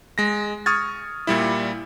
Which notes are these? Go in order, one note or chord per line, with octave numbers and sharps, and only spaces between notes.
G#3 A#6
C#6 D#6 F6 G#6 A6
A#2 G3 E4